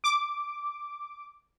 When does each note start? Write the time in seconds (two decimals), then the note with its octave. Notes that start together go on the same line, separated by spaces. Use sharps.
0.04 D6